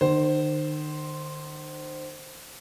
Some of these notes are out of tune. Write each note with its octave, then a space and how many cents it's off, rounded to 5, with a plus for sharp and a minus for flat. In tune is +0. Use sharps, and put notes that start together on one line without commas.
D#3 -40 C5 +0